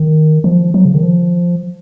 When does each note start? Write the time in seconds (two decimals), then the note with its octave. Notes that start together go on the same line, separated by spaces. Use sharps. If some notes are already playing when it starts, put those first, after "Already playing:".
Already playing: D#3
0.44 F3
0.74 F#3
0.85 C#3
0.94 D#3
1.03 F3